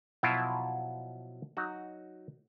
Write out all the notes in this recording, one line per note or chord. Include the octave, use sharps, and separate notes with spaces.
B2 F3 F#3 E4 F4
F#3 D#4 F#4